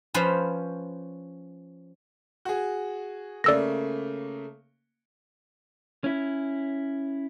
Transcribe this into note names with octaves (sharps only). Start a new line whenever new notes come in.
F3 C#4 B4 C5
F#4 G#4
C#3 A3 A#3 D5 E6 A#6
C#4 E4